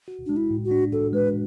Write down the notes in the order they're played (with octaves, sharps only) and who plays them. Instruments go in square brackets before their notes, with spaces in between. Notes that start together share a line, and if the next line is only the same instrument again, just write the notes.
[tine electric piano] F#4
[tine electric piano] G#3 [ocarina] D4
[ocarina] E4
[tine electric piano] A2
[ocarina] F#4
[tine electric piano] D4
[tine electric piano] F#4 [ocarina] A4
[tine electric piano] G#3 [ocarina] B4